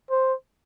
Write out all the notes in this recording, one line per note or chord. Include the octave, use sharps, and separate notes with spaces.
C5